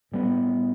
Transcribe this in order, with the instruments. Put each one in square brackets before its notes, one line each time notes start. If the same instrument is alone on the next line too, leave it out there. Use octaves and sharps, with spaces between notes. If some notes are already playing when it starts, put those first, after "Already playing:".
[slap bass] A2 G3 B3